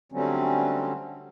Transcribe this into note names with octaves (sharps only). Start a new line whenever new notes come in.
D3 F#3 G3 A3 C4 C#4